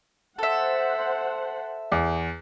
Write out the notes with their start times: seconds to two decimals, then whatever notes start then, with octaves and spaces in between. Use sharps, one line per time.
0.39 A4 C5 E5 F#5
1.92 E2